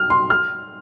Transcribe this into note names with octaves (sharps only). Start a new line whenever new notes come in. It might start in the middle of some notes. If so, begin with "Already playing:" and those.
Already playing: F6
C6
F6